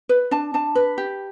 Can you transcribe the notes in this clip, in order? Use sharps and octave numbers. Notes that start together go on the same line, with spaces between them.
B4
D4 A5
D4 A5
B4
G4